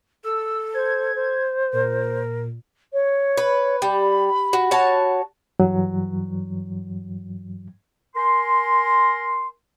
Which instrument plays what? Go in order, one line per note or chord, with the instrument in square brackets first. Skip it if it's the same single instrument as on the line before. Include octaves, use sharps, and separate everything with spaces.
[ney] A4 [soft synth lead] E6
[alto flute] C5 [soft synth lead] G#6
[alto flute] C5
[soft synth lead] A#2 [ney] A#4
[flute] C#5
[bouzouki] B4
[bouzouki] G3 [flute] B5
[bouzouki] F#4
F#4 C#5 A5
[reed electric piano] G2 E3 F#3
[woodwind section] A#4 G#5 C6